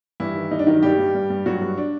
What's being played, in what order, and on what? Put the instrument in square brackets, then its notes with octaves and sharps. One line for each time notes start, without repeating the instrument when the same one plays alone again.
[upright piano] G2 E3 E4
D#3
G2 D#4
D4
D#3 F#3 D#4
G2 G3 G4
G2
G2
G2
G2 F#3 F#4
G2
D4